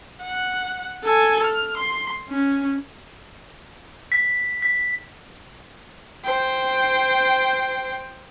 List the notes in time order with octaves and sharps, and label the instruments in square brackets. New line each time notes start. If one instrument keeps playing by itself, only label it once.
[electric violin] F#5
A4 G#5
F6
C6
C#4
[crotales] B6
B6
[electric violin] C5 G5